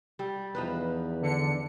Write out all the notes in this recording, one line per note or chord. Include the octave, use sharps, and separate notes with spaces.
G3
E2 F3 D#4 B4
D3 C#7